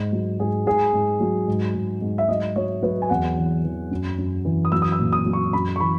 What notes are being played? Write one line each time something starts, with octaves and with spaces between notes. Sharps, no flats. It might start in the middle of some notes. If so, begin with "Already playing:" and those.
Already playing: G#2
F#3
G#2 G#4
G#2 G#4
G#2
F#3
G#2
G#2
G#2
E5
F#3 D#5
F#3 C#5
F#3 B4
G#5
E2 F#5
E3
E3
F#2
F#2
E3
D#6
F#3 E6
D#6
E6
A#2
D#6
F#3
C#6
F#2 B5
C#6
E3 B5